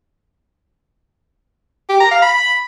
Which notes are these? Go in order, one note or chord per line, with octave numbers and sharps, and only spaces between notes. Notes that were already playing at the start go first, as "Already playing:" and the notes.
G4
A#5
F5
B5